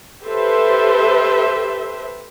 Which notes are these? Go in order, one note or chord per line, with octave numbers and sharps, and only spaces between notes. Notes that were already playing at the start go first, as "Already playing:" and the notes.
G4 A4 B4 C5 E5